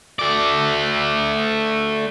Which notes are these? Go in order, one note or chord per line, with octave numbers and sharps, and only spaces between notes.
A3 D5